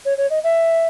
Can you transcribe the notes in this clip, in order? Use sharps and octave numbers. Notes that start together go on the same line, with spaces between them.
C#5
C#5
D#5
E5